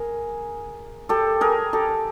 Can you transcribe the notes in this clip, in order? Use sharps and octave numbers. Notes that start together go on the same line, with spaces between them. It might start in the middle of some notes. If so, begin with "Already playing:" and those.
Already playing: G#4 A#4
G4 A4
G#4 A#4
G4 A4